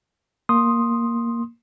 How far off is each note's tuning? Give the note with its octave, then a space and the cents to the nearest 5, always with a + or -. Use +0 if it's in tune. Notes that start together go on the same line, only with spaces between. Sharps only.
A#3 +0 C6 +10 D#6 +0